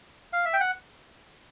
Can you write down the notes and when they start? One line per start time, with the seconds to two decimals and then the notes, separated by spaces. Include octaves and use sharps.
0.33 F5
0.45 E5
0.53 G5
0.60 F#5